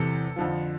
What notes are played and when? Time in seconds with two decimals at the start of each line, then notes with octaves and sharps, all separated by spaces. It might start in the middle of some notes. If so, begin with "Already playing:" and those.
Already playing: E2 C3 E3 A4
0.36 F2 D3 F3